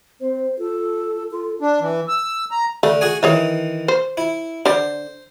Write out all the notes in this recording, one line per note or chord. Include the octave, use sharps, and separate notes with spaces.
C4 C5
F4 A4
F4 A4
D4
E3
E6
A#5
D3 A3
F#4 G#4 G#5
D#3 E3 G#4 C#5 E5
C5
E4
D3 C5 D5